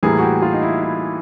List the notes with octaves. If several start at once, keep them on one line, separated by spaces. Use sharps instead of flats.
A2 E3 G3 A#3 G#4
F#4
G4
F4
D#4
E4
E4